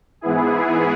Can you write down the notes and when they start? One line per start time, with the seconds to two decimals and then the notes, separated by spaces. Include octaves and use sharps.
0.21 G#2 E3 B3 E4 G#4